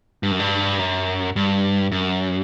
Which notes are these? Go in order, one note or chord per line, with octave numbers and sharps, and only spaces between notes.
G2
F#2
G2
F#2
G2
F#2